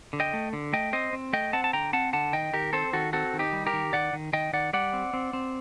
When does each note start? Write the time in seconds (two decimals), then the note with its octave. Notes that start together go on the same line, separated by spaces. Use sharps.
0.13 D3
0.20 D#5 G5
0.33 A3
0.53 D3
0.73 A3 D#5 G5
0.93 C4 C5 D#5
1.13 C4
1.33 A3 D#5 G5
1.53 C4 F#5 A5
1.64 A5
1.73 D3 G5 A#5
1.93 C4 F#5 A5
2.13 D3 F#5 A5
2.33 D#3 D#5 G5
2.53 D#3 G4 A#4
2.73 C4 A4 C5
2.93 D#3 F#4 A4
3.13 C4 F#4 A4
3.33 D#3
3.39 D#4 G4
3.53 G3
3.67 G4 A#4
3.73 D#3
3.93 D#3 D5 F#5
4.13 D#3
4.33 D#3 D#5 G5
4.53 D#3 D5 F#5
4.73 G3 D5 F#5
4.93 C4
5.13 C4
5.33 C4